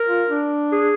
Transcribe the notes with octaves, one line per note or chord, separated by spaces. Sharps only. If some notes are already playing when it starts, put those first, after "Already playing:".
Already playing: A#4
F4
D4
G#4